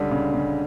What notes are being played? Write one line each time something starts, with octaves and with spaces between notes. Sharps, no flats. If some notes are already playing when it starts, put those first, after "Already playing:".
Already playing: C#2 D3 G3 C#4
C#3
C#3